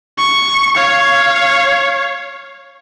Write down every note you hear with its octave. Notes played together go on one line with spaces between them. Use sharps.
C#6
C#5 F5